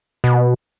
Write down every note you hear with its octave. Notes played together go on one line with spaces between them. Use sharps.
B2